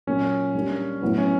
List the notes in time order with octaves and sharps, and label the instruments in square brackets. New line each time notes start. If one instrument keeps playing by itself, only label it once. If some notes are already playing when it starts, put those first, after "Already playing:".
[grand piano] A#2 F#3 A#3 [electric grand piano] C#4
[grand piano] G3 A#3 D4
A2 F#3 B3 E4
[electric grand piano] C#4